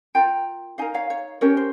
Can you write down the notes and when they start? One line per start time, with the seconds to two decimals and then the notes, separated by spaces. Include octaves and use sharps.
0.15 F4 A#4 G5 A#5
0.78 D#4 A#4 F5 G#5
0.94 C#5 F5
1.10 C#5
1.41 C#4 G4 A#4 C#5
1.57 C5